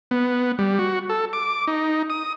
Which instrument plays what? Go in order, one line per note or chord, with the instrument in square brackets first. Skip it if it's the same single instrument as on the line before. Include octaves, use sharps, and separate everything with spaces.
[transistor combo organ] B3
G3
F#4
A4
D6
D#4
D#6